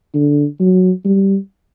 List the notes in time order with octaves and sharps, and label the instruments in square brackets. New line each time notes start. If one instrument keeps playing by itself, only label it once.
[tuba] D3
F#3
G3